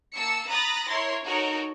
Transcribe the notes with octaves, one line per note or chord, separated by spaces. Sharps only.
A#3 A5 E6 C#7
A#5 B5 D#6 F#6 A6 A#6
E4 A#4 C#5 C6
D#4 F#4 A4 A#4 C#5